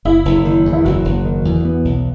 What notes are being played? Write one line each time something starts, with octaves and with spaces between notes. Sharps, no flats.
F#1 E4
F#1
D#3
E2
E4
F#1 F#4
F#1
D#3
E2
B3
B1